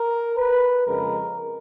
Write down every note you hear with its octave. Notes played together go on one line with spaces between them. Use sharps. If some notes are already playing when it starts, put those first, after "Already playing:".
Already playing: A#4
B4
F2 C#3 G#3 A#4